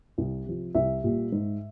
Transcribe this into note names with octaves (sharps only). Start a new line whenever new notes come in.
C2
C3 F3
C2 E5
A#2 G3
G#2